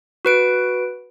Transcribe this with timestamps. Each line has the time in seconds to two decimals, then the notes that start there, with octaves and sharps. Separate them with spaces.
0.25 F#4 B4 D7